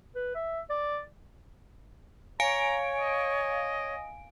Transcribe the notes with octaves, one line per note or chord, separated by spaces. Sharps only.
B4
E5
D5
C#5 F5 G#5 A#5 D7
D#5